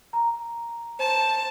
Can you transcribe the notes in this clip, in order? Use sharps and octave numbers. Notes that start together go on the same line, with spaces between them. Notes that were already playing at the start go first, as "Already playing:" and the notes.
A#5
C5 A5